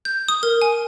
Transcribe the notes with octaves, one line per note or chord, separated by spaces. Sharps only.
G6
D#6
A#4
G#5